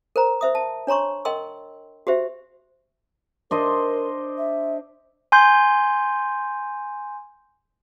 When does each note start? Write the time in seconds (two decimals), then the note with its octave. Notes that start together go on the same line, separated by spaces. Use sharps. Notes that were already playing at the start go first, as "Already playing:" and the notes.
0.16 A#4 C5 A#5
0.41 C5 E5 D#6
0.55 A5
0.87 D4 C#5 A#5 C6 C#6
1.25 A#4 D#5 G5 C6 E6
2.07 F#4 G4 C5 E5
3.51 D4 A#4 C5 D#5
4.38 E5
5.32 G#5 C6 G6